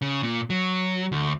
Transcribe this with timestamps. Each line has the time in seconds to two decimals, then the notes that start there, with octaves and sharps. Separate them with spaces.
0.02 C#3
0.23 A#2
0.50 F#3
1.12 D2